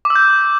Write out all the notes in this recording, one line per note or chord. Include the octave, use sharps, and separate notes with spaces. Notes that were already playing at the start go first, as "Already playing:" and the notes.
D6
E6
G6